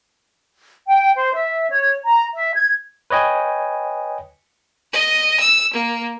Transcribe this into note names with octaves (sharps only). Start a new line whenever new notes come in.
G5
C5
E5
C#5
A#5
E5
G#6
B4 C#5 D#5 G5 G#5
D#5
E6
A#3